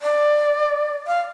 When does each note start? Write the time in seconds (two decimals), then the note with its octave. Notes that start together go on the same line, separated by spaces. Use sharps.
0.02 D5
1.07 F5